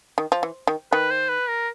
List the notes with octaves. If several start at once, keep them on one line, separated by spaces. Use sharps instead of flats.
D#3
F3
E3
D#3
D#3 B4
C5
B4
A#4